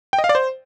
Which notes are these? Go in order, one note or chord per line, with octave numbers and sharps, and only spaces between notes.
G5
D#5
F5
D5
C5